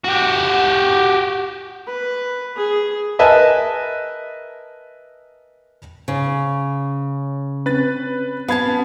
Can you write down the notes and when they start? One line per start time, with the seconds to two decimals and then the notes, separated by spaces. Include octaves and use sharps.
0.04 F#4 G4
1.87 B4
2.57 G#4
3.19 A#4 B4 D#5 E5 G#5 A5
6.08 C#3
7.66 C4 C#4 B4 A6
8.48 B3 F5 A5 B5 G#6